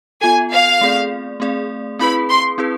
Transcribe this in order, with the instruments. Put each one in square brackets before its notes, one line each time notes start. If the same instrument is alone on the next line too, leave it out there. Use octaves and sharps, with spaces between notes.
[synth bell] B3 F4 A4 [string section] G#5
[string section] F5
[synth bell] A3 C4 G#4 D5
A3 C4 G#4 D5
[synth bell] C4 E4 G#4 B4 [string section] B5
[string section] C6
[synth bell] C4 E4 G#4 B4